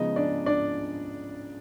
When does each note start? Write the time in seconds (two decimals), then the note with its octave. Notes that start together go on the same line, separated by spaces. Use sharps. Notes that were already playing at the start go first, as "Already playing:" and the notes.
Already playing: C#3 F3 G#3 B3 D#4 D#5
0.16 D4 D5
0.46 D4 D5